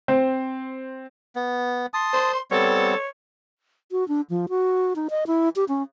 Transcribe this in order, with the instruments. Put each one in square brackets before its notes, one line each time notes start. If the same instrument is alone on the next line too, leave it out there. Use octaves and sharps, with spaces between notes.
[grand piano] C4 C5
[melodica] B3
[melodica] A5 D#6 [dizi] C6
[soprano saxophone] C5
[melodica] G3 B3 C4 [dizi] A4 [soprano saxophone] C#5
[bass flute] F#4
D4
F3
F#4
D#4
D#5
E4
G4
C#4